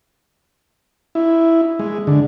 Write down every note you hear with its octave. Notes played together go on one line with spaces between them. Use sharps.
E4
G#3
D3